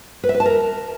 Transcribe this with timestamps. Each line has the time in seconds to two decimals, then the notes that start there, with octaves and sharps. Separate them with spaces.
0.24 B4
0.29 E5
0.35 B4
0.40 A5
0.46 A#4